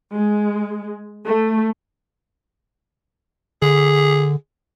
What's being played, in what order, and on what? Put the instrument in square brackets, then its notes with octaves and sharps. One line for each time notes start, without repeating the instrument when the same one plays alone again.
[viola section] G#3
A3
[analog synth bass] D3 [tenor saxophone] G#4